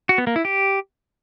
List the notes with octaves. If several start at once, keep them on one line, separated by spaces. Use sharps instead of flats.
F#4
B3
A#3
E4
G4